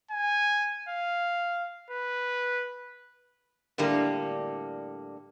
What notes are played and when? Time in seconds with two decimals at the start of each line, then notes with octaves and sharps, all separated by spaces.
0.11 G#5
0.89 F5
1.90 B4
3.78 A2 D3 G3 A#3